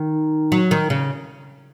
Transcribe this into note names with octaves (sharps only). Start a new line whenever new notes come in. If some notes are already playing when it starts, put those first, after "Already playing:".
Already playing: D#3
F#3
D#3
C#3